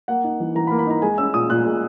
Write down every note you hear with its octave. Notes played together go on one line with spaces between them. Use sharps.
A#3 F#5
D#4
E3
E3 A#5
B5
A#3
B5
D#4 A#5
G#3 G#5
C#4 E6
A#2 D#6
A#2 F#6
G#3